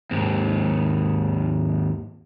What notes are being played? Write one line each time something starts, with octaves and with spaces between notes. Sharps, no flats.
D#2 G#2